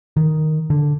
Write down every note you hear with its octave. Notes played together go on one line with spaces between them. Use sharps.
D#3
D3